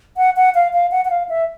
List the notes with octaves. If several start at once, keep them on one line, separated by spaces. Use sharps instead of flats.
F#5
F#5
F5
F5
F#5
F#5
F5
E5